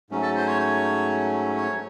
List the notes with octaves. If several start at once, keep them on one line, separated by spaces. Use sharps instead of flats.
G#2 F#3 A3 C#4
A4
C5
C#5
C#5
C#5